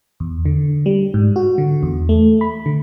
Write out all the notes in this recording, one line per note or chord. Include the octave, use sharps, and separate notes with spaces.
E2
D3
G3
G#2
F#4
D3
E2
A3
B5
D3